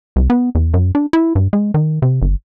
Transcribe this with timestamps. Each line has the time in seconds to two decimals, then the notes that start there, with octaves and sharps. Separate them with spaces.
0.16 C2
0.30 B3
0.55 E2
0.74 F#2
0.95 D4
1.13 E4
1.35 G2
1.53 G#3
1.74 D#3
2.02 C3
2.22 G1